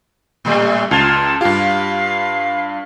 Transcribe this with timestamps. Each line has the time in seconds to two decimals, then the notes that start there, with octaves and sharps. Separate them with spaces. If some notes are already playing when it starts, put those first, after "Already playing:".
0.45 A2 G3 A3
0.91 C#2 F4 A5 G#6
1.41 G2 F4 G4 F5